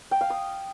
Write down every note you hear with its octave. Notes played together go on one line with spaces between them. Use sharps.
G5
F5
D#6